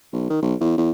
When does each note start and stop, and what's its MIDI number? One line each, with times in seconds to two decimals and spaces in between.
0.13 0.28 35
0.30 0.38 51
0.42 0.55 35
0.60 0.73 40
0.78 0.91 40